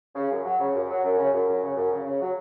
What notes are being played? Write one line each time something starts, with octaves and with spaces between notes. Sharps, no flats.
C#3
F#2
F#3
C#3
F#2
F#3
F#2
C#3
F#2
F#2
C#3
F#2
C#3
C#3
F#3